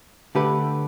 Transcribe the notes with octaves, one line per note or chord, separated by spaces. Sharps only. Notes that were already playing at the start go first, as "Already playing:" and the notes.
D3 A3 G4 B4